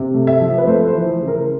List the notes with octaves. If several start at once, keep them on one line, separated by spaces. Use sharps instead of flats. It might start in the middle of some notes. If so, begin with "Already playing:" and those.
Already playing: C3
A3
E5
F3
B4
A3 C5
C5
E3
C#3
A#4